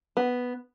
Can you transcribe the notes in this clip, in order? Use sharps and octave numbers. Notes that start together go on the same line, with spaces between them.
B3